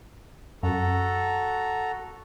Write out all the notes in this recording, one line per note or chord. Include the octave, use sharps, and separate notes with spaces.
F#2 F#4 A4 A#5